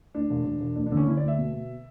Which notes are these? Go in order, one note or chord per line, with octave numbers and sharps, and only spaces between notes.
D2 D4
E1
E1
E1
D2 D4
D4
D3
C#4
D3 E4
D5
D2
E5
B2
B2